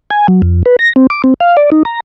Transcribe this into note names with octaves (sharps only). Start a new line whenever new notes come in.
G#5
F#3
F2
B4
A#6
C4
D6
C4
F5
D5
D#4
A#5